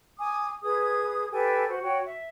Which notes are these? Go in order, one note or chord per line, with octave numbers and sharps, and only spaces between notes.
G#5 D6 D#6
G#4 B4 D#6 G#6
G4 A4 B4 G#5
F#4 C5
F#4 C#5 G5
E5